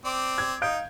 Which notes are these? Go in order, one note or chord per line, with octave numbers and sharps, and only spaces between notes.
C4 D5 D6
G#6
D#4 F5 D#6 G6 D7